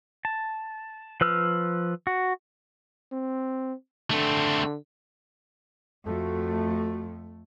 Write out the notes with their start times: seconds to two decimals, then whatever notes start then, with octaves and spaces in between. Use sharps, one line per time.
0.25 A5
1.21 F3 B4 E6 F6
2.07 F#4
3.12 C4
4.11 D3 A3 C4
6.06 F2 A3 F#4